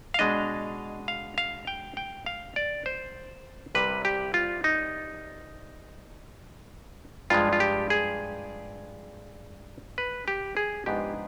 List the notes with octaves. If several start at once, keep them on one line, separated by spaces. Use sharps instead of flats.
F5
B2 G#3 D4 D#5
F5
F5
G5
G5
F5
D5
C5
C2 C3 G3 B4
G4
F4
D#4
G2 F3 G#3 F4
F4
G4
G#4
B4
G4
G#4
G#2 F3 B3 D4 G4